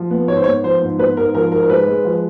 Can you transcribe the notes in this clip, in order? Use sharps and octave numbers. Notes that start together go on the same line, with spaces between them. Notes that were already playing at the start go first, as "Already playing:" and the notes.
Already playing: F3
B3
G#2 C#5
C5
B3 C#5
F3 C5
G#2
B3 B4
G#2 A#4
F3 A#4
G#2 A#4
A#4
G#3 B4
G#3
F3